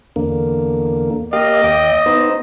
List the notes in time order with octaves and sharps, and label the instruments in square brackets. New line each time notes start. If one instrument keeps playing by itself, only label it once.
[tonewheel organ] E2 D3 A#3
[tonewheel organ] A#3 G4 F5 [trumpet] D#5
[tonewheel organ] D#2 G5
B3 D#4 C5